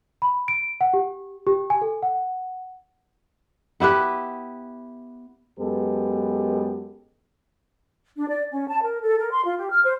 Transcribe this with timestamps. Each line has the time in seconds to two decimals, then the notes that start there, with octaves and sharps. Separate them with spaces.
0.22 B5
0.48 D7
0.81 F#5
0.94 G4
1.47 G4
1.70 G#5
1.82 A4
2.03 F#5
3.80 B3 E4 G4 B4
5.59 F#2 G#3 B3 G4 A4 B4
8.17 D4
8.29 D5
8.51 C#4
8.69 A5
8.83 A#4
9.02 A4
9.19 A#4
9.32 C6
9.45 F4
9.58 G4
9.71 F6
9.84 C5